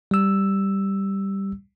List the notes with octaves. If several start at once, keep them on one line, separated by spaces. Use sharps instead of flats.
G3 E6